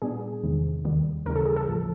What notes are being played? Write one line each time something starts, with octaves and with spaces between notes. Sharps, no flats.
A#2 G3 B3 D4 G#4
E2 C3 D#3 G#3
D#2 D#3 G3
D#2 C#3 E3 G3 A#4
A4
G#4
A4
A#1 A2 F3